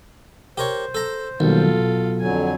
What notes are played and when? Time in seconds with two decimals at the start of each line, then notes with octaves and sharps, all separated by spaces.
0.58 G4 A#4 C5 C#5
0.95 A4 A#5
1.40 B1 D#3 G3 A#3 F4 A4
1.80 B2
2.21 F2 D3 F#3 G#5